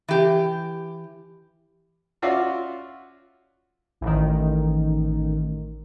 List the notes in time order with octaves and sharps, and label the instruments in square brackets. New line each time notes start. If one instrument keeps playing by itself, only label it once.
[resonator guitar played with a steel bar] E3 G4
[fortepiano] C#4 F4 F#4 D5 E5 F5
[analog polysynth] A1 D#3